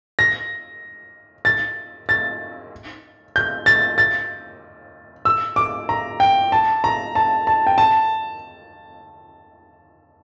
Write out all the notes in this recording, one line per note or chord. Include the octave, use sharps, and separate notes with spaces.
A#6
A6
A6
G6
A6
A6
E6
D6
A#5
G5
A5
A#5
A5
A5
G5
A5